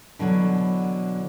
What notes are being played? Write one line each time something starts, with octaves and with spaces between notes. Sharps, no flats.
B2 D3 E3 F#3 F#4